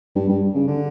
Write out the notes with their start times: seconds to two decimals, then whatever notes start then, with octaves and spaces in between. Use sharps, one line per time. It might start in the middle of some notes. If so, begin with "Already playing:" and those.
0.15 G2
0.29 G2
0.54 C#3
0.67 D3